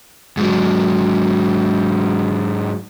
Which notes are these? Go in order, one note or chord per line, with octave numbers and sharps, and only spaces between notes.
G#2 F#3